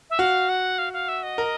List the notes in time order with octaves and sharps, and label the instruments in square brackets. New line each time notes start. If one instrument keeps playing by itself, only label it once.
[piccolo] E5
[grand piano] F#4 [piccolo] F5
[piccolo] F#5
F5
F5
E5
D#5
[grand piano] A#4